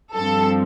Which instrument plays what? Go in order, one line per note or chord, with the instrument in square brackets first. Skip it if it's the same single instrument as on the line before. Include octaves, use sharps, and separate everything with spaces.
[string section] G2 F3 C4 A4